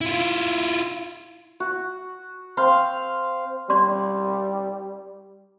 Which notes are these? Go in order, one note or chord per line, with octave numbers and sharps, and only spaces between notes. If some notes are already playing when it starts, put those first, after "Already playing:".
E4 F4
F#4
C4 F5 C6
G3 D5 C6